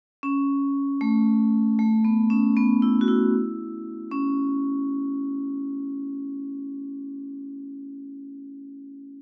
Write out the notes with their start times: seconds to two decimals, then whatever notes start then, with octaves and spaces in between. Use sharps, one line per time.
0.23 C#4
1.01 A3
1.79 A3
2.05 B3
2.30 C#4
2.57 B3
2.82 E4
3.01 F#4
3.08 E4
4.11 C#4